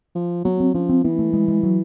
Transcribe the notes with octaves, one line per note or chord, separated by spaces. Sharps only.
F3
F#3 B3
C4
F3 C#4
C4
E3 B3
A3
G#3
G#3
F#3